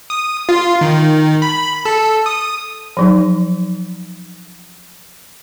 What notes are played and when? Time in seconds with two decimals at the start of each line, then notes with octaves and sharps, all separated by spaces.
0.10 D#6
0.49 F4
0.81 D#3
1.42 B5
1.85 A4
2.26 D#6
2.97 F3 F#3 D#4